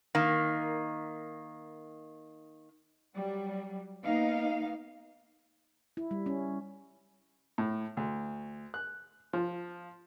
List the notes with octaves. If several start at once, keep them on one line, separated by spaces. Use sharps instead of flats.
D#3 A#3
F#3 G3
A#3 B3 D#4 F5
E4
G3
C#4
A2
D2
F#6
F3